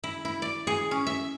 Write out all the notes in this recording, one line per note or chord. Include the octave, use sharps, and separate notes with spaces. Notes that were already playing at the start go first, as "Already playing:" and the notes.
E4
E4
D5
G#4
C#4
E5